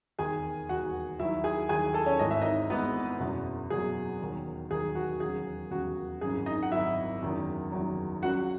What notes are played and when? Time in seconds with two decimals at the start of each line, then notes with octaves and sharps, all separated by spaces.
0.18 E1 D#2 D#3 G#4 G#5
0.69 E1 D#2 D#3 F#4 F#5
1.19 D#2 D#3 F#3 E4 E5
1.44 G#4 G#5
1.69 D#2 D#3 F#3 G#4 G#5
1.94 A4 A5
2.06 C#4 C#5
2.19 G#1 G#2 E3 D#5
2.31 E5
2.41 D#4 D#5
2.69 G#1 G#2 E3 B3 B4
3.20 F#1 E2 B2 F#3
3.70 F#1 E2 B2 F#3 G#4
4.21 E1 D#2 D#3 F#3
4.70 E1 D#2 D#3 F#3 G#4
4.95 F#4
5.20 E1 D#2 C#3 F#3 G#4
5.71 E1 D#2 C#3 F#3 F#4
6.21 G#1 F#2 C#3 E3 G#4
6.46 D#4 D#5
6.63 F#5
6.71 G#1 F#2 C#3 E3 E4 E5
7.21 F#1 E2 D#3 F#3
7.72 F#1 E2 D#3 F#3
8.22 C#2 C#3 F#3 F#4 F#5